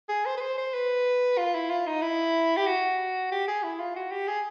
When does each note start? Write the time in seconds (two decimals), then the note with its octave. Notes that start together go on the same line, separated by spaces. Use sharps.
0.09 G#4
0.25 C5
0.37 B4
0.41 C5
0.58 C5
0.74 B4
1.38 F4
1.55 E4
1.70 F4
1.87 D#4
2.02 E4
2.57 G4
2.67 F#4
3.32 G4
3.48 G#4
3.63 E4
3.80 F4
3.96 F#4
4.11 G4
4.28 G#4